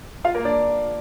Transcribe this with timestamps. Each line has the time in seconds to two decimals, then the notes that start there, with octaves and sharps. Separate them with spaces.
0.24 F4 F5
0.35 A#3 A#4
0.45 D4 D5